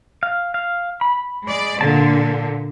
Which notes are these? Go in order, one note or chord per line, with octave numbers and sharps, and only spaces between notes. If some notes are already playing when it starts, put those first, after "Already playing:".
F5
F5
B5
G#3 D5
A#2 D3 A5